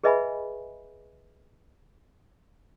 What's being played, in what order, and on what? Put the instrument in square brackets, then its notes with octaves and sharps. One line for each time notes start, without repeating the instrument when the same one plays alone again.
[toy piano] G#4 B4 D#5 E5 G#5 B5